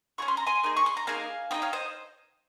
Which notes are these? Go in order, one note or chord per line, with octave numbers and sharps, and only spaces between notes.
C#4 F4 G#4 C#6
C6
A#5
G#5 C6
A#3 D#4 G#4
C#6
C6
A#5
A#3 D#4 G#4 F5 G#5
C4 D#4 G#4 D#5 G5
C#5 F5
C5 D#5